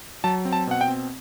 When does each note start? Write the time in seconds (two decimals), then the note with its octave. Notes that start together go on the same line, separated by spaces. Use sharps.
0.24 F#3 A5
0.45 C4
0.53 A5
0.67 B2 F#5
0.81 G5
0.88 C4